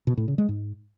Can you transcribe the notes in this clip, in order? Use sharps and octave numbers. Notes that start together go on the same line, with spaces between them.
B2
A2
C#3
G#3
G#2